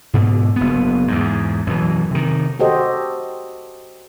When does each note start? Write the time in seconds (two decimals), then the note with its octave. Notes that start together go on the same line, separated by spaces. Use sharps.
0.13 G#2 B2 D3
0.56 F#1 B3
1.08 E2 G#2
1.67 F#2 B2 E3
2.11 C3 D#3
2.59 F#4 G4 A4 C5 D#5